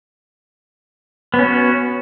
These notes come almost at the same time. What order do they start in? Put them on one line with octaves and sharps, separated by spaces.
B3 C#4 F#4